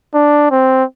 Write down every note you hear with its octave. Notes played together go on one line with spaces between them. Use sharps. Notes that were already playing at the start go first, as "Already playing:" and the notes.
D4
C4